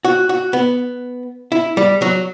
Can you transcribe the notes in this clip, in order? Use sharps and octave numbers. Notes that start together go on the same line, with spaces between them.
F#4
F#4
B3
E4
G3
F#3